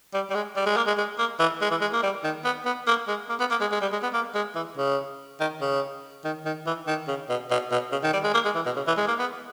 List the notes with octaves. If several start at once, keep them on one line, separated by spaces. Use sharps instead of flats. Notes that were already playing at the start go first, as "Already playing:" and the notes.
G3
G3
G#3
G3
G#3
A#3
G#3
G#3
A#3
E3
G#3
E3
G#3
A#3
G3
D#3
B3
B3
A#3
G#3
A#3
B3
A#3
G#3
G#3
G3
G#3
B3
A#3
G#3
E3
C#3
D#3
C#3
D#3
D#3
E3
D#3
C#3
B2
B2
B2
C#3
D#3
G3
G#3
A#3
G#3
E3
B2
C#3
E3
G#3
A#3
B3